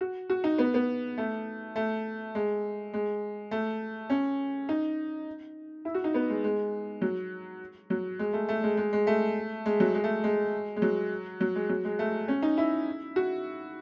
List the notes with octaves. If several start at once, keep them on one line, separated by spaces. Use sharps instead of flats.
F#4
F#4
D#4
B3
B3
A3
A3
G#3
G#3
A3
C#4
D#4
E4
F#4
D#4
B3
G#3
G#3
F#3
F#3
G#3
A3
A3
G#3
G#3
G#3
A3
G#3
F#3
G#3
A3
G#3
G#3
F#3
F#3
G#3
F#3
G#3
A3
C#4
D#4
E4
F#4